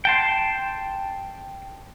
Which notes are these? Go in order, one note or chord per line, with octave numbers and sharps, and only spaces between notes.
G5 A5 C6